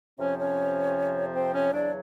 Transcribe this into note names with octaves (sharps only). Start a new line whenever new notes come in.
F2 C3 F3 C#4 C#5
C#4 C#5
C4 C5
C#4 C#5
E2 C#3 F#3 D4 D5